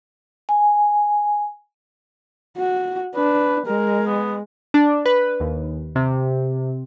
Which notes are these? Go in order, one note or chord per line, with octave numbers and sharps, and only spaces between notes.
G#5
F#4
D4 B4
G#3 A#4
B3
D4
B4
D#2
C3